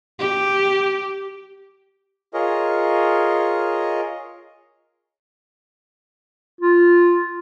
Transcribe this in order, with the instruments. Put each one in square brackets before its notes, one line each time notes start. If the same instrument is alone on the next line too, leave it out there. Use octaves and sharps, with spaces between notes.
[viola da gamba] G4
[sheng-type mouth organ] F4 G#4 A#4 C#5 D#5
[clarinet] F4